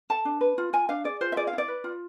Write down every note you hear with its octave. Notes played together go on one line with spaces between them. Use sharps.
A4 A5
D4
B4
F4
F4 G#5
D4 F5
G#4 D5
F4 C5
E5
G#4 D5
F5
E4
D5
B4
F4